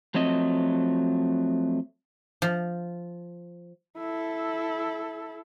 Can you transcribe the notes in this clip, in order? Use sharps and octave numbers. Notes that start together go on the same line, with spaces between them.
F3 F#3 A3 C4 D#5
F3
E4 A4